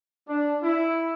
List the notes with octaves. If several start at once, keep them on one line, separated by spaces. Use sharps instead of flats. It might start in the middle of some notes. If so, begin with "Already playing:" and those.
D4
E4